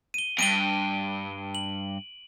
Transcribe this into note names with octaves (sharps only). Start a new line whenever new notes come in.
D#7 G7
E2 G2 D7 D#7 G7
F#7